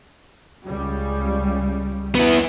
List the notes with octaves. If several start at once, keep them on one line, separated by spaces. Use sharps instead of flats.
C#2 C#3 G3
B3 E4